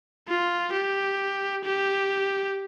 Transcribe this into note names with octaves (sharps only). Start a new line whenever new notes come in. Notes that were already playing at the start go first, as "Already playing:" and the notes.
F4
G4
G4